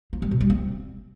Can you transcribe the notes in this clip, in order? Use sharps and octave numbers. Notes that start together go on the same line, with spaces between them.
F3
G3
B2
G3
C4